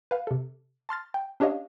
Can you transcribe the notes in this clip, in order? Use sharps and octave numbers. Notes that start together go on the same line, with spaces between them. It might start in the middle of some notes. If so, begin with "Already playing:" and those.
B4 F5
C3 A4
A5 C6 F6 A6
G5
C#4 D4 G4 C#5 D#5 F5